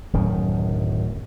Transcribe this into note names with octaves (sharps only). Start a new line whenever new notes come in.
D1 F#2 D#3